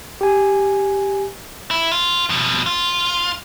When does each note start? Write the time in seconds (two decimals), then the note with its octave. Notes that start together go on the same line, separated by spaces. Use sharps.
0.21 G4 G#5
1.71 E4
1.92 F4
2.29 F2 B2
2.66 F4